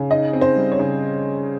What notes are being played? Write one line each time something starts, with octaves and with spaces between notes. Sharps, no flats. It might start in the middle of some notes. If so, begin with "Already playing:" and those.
Already playing: C#3
D#4 D#5
C4
C5
G3
C#5
C#3